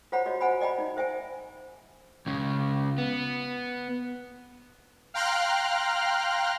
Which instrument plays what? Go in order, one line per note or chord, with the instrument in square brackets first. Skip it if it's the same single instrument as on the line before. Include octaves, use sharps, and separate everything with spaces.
[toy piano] F4 C5 C#5 F#5 A#5 B5
F4 F#4 C#5 D#5
C5 F#5 G#5 B5
D5 D#5 G5 A#5 B5
D#4
C5 E5 G5 G#5
[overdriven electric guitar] C#2 C#3
B3
[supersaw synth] F5 G5 A#5 C6 F6 F#6